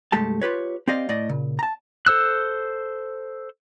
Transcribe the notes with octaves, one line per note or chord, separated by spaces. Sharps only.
C2 G2 G#3 A3 G4 A5
F4 G4 B4 C#5
C4 G4 D5 D#5 F5
A2 D5 D#5
A#2 C#3
A5 A#5
A4 C5 E6 F#6